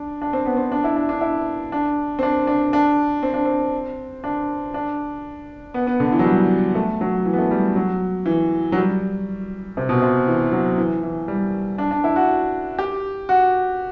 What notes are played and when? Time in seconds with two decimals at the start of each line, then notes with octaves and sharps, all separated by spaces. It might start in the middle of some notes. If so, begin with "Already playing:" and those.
Already playing: D4
0.22 D4
0.33 C4
0.46 B3
0.57 C4
0.72 D4
0.84 E4
0.96 D4
1.09 D4
1.21 E4
1.72 D4
2.19 C4
2.23 D4
2.47 D4
2.73 D4
3.23 C4
3.34 D4
3.45 C4
4.24 D4
4.74 D4
5.74 B3
5.87 B3
6.00 D3
6.12 E3
6.19 F#3
6.24 G3
6.75 A3
7.01 F#3
7.25 E3
7.33 B3
7.38 A3
7.51 G3
7.76 F#3
8.26 E3
8.72 F#3
8.77 G3
9.77 C3
9.89 B2
10.02 C3
10.27 E3
10.52 F#3
10.78 E3
11.03 E3
11.28 G3
11.78 D4
11.91 D4
12.04 E4
12.16 F#4
12.79 G4
13.29 F#4